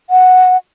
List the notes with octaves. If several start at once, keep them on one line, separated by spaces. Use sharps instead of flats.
F#5